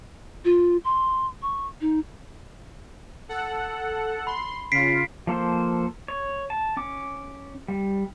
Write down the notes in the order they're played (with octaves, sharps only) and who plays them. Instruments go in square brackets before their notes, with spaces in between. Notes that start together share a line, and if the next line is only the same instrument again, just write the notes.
[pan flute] F4
C6
C#6
D#4
[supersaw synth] A4 F#5
[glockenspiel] B5 [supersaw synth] C6
[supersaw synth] C#3 F4 [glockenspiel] B6 C7 D7
[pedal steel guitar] F3 A#3 A4 C5
C#5
A5
C#4 D6
G3